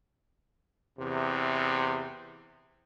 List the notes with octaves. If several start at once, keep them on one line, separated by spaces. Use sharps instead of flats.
E2 C3